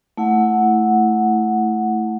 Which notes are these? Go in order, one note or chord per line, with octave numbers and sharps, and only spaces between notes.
A3 E4 F#5